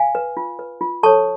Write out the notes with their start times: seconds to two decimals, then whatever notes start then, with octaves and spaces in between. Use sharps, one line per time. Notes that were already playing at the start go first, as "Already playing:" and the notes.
Already playing: F5 G#5
0.15 B4
0.37 F4
0.59 B4
0.81 F4
1.03 A4 C#5 A5 C#6